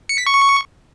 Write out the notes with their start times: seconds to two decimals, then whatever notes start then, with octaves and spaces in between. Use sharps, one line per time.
0.09 C#7
0.18 B6
0.26 C#6